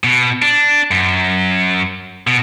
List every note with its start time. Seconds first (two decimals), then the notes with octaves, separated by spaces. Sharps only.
0.04 B2
0.42 D4
0.91 F#2
2.27 B2